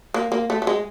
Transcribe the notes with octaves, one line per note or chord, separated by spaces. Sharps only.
A#3
A#3
A3
A3
G#3